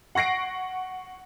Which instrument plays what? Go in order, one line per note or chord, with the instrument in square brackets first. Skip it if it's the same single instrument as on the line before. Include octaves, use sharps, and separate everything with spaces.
[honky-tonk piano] F#5 C#6 A#6 C7 D7